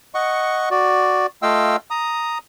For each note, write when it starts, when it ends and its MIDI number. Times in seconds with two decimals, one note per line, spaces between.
0.15 0.69 75
0.15 0.69 78
0.15 0.69 85
0.71 1.26 66
0.71 1.26 74
1.42 1.76 57
1.42 1.76 65
1.42 1.76 75
1.42 1.76 77
1.42 1.76 79
1.42 1.76 88
1.90 2.38 82
1.90 2.38 87